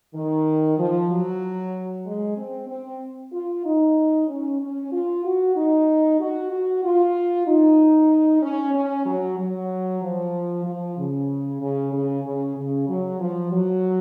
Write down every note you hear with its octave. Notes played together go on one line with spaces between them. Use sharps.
D#3
F3
F#3
G#3
C4
C4
F4
D#4
C#4
C#4
F4
F#4
D#4
F#4
F#4
F4
D#4
C#4
C#4
F#3
F#3
F3
F3
C#3
C#3
C#3
C#3
C#3
F#3
F3
F#3